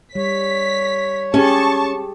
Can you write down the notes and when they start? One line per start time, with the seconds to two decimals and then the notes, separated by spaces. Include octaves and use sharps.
0.15 G3 C#5 B6
1.34 C#4 G4 G#4 A5 C#6